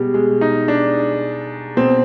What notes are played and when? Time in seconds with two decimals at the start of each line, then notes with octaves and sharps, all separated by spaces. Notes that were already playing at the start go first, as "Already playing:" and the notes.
Already playing: B2 G3 G#3
0.14 G#3
0.41 D#4
0.68 D4
1.77 B2 C4